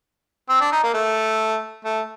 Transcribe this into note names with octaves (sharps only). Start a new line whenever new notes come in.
C4
D4
D#4
A#3
A3
A3